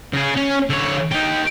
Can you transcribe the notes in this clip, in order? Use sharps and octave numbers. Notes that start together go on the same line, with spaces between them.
C#3 G#4
C#4
D3 C#5
D#4 G4